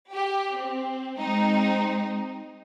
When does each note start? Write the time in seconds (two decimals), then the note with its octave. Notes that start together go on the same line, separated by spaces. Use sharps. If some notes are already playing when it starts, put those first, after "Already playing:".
0.13 G4
0.56 C4
1.18 G#3 C4 D#4